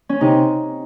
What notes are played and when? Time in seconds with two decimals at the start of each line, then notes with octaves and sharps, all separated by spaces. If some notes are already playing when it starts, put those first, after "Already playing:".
0.09 C#4
0.21 C3 D#4